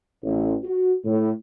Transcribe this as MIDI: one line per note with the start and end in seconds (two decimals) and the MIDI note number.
0.24 0.54 33
0.63 0.94 66
1.05 1.29 45